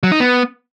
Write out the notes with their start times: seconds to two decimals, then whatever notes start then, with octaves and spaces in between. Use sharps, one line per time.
0.03 F#3
0.12 D#4
0.20 B3